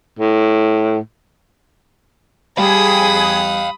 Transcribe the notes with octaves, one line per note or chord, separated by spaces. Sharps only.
A2
G3 G#4 F5 G5 B5 D#6